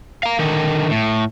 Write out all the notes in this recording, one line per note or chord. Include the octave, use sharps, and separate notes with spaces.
F5 A#5
D3 D#3
A2